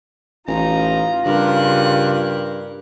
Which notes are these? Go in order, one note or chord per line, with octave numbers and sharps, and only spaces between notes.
A1 D#4 F4 A#5
G2 C#3 G4 A#4 F#6